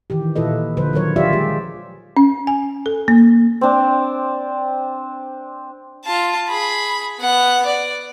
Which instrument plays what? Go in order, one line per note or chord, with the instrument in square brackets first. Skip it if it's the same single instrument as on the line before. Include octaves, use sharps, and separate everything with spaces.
[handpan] D#3 E3 G4
A#2 E4 F4 A4 B4 D#5
D3 F3 B4 C5
D#3 F#3 A#4 C#5
F3 F4 G4 D5 E5
G#3 G4 G#4
[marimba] C#4
G#5
A4
A#3
[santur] C4 D4
[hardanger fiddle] F4 A5
G#4 B5
B3 F#5
D5